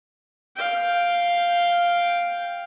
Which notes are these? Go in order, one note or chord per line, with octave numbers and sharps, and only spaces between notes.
F5 G5